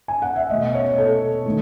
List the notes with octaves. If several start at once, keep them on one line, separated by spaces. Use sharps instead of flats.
G#5
F#5
E5
B2 A3 D#5
C#5
A4
D#3 A3